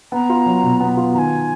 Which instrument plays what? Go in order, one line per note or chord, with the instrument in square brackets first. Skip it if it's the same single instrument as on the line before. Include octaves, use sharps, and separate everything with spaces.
[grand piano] B3 [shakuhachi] A#5
[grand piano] F4
F#3
B2
B3
F4
[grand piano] D#3 [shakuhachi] A#5
[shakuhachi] G#5